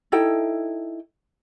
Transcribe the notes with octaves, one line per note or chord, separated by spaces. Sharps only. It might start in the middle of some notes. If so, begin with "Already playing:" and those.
D#4 E4 A4 G5